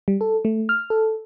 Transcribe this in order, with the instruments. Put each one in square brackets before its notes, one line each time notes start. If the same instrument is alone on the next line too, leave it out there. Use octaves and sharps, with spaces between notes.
[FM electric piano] G3
A4
A3
F6
A4